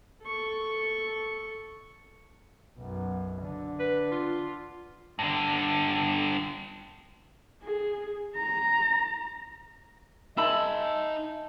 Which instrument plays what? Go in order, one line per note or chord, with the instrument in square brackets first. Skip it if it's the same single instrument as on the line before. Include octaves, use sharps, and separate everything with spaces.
[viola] A4 C#6
[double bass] B1 F#2
D3
[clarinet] B4
F4
[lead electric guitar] G2 D3
[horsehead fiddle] G#4
A#5
[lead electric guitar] D#4 C6 [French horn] D#5 [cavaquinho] E5 B5 [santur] G#5 A5